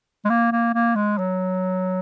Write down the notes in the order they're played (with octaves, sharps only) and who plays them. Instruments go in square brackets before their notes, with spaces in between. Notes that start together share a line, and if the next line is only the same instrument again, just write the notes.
[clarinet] G#3
A#3
A#3
A#3
G#3
F#3